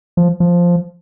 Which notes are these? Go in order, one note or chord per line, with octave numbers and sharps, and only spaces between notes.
F3
F3